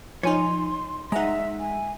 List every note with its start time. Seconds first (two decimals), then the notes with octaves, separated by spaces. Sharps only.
0.23 F3 D#4 C#5 G#5 C6
1.12 G#3 D#4 E5 F#5 A#5
1.60 G#5